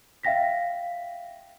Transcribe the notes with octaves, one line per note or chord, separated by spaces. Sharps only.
E5 F5 G5 A#6 B6